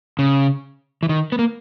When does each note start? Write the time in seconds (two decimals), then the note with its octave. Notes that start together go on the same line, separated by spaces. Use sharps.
0.19 C#3
1.03 E3
1.09 D#3
1.32 B3
1.39 A#3